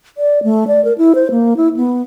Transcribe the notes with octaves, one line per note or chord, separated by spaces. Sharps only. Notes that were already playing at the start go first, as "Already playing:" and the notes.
D5
A3
D5
A#4
E4
C5
A#3
E4
B3